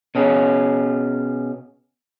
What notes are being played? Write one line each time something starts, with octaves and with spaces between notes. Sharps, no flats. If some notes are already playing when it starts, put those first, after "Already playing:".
B2 C#4 G#4